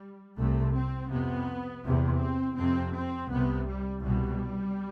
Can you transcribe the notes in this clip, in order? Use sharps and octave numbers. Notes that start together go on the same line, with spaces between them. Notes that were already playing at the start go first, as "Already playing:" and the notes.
Already playing: G3
C2 C3 A3
C4
F2 C3 B3
E2 C3
C4
F2 C3 C4
C4
C2 C3 B3
G3
C2 B2 G3